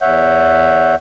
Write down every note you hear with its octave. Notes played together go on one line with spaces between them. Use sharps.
E2 C#5 E5 F#5 G6